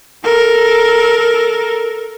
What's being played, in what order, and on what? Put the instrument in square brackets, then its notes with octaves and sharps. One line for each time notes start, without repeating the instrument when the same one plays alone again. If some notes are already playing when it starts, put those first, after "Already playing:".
[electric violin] A4 A#4